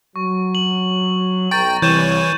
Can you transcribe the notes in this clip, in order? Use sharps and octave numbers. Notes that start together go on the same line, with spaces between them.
F#3 C#6
F#7
B1 G5 A#5 C#6 A6 F#7
C2 E3 C#5 G6 D#7 E7